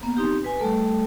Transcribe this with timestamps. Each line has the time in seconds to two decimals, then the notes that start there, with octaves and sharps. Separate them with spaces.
0.03 A#3 B3
0.17 C4 D#4 G4
0.44 B4 G#5
0.59 G3 A3 A4